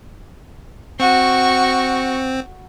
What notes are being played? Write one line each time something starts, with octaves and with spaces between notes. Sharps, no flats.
C4 F#4 C#6